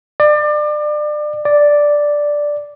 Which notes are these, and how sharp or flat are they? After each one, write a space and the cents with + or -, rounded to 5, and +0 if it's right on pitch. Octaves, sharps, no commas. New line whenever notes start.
D5 +30
D5 +0